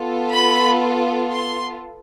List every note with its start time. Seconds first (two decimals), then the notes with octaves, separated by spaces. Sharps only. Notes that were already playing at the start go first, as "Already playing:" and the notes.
Already playing: B3 F4 A4
0.33 B5
1.31 C6